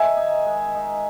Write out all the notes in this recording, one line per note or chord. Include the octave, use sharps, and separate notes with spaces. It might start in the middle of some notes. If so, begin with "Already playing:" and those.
Already playing: D#3 E5 G#5
D#4
G#3
D#4